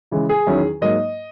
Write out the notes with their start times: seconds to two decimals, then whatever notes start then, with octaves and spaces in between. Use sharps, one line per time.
0.11 C#3 E3 G#3
0.29 G#4
0.46 E2 D#3 F#3 C#4 E4
0.81 G#2 F#3 A#3 D#5